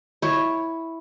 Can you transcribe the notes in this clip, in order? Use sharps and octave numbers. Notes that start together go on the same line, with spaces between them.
E4 C#5